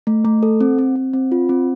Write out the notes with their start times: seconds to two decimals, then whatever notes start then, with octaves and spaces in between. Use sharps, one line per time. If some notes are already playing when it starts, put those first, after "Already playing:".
0.07 A3
0.25 A3
0.43 A4
0.61 C4
0.78 C4
0.96 C4
1.13 C4
1.32 F4
1.49 C4